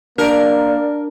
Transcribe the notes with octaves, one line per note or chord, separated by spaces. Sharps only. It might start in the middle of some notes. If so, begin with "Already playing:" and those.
A#3 D4 A#4 D5